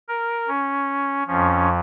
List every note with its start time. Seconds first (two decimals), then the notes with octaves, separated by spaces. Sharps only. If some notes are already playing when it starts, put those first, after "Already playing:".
0.09 A#4
0.48 C#4
1.27 F2 F3 C#4